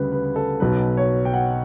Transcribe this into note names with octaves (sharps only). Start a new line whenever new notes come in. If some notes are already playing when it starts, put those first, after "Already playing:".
Already playing: D2 C#3 G3 B4
B4
A4
B1 B2 F#3 B4
C#5
G5
F#5